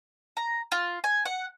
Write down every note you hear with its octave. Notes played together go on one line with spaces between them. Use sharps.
A#5
F4
G#5
F#5